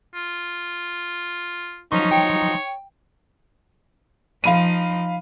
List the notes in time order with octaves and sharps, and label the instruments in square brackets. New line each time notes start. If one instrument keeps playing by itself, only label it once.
[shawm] F4
[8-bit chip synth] F3 F#3 C6 [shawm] C#4 [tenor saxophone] D#4 [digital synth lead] C#6
[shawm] C#5 [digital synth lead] G5
[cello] F3 D#4 [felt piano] F5 B5 D#7